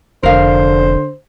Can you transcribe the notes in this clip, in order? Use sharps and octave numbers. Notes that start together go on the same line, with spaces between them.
F1 D3 A#4 C5 F5